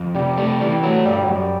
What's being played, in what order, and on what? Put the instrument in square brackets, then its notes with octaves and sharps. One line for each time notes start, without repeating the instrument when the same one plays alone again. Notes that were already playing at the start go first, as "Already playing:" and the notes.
Already playing: [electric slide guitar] F2
[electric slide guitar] C3 [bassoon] G3
[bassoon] G3 [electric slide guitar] A3
[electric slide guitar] E3 [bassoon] G3
[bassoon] F#3 [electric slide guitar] A3
[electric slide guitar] G2 [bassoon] G3
[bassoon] F#3
[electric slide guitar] F#2 [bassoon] G3